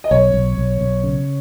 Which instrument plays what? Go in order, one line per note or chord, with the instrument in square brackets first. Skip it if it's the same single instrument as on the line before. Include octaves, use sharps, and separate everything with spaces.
[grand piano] D#5
[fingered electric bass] B1 [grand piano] C#5
[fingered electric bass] B1
B1
B1
C#3